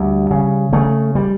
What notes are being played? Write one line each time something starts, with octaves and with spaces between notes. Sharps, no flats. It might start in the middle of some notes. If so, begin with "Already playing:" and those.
Already playing: D2 G3
C#3
C#3 A3
G3